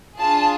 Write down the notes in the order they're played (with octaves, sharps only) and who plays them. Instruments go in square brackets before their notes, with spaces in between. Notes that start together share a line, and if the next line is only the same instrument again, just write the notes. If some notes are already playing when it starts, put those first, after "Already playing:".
[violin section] D4 F4 G#4 A5